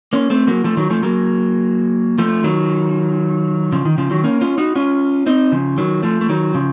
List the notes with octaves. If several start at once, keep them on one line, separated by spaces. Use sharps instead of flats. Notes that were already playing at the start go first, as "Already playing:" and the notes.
A#3 C#4
A3 C4
F#3 A#3
F3 A3
D#3 F#3
F3 A3
F#3 A#3
F3 A3
D#3 F#3
C#3 F3
D#3
C#3 F3
D#3 F#3
A#3 C#4
C#4 F4
D#4 F#4
C#4 F4
C4 D#4
C#3 F3
D#3 F#3
F3 A3
A3
D#3 F#3
C#3 F3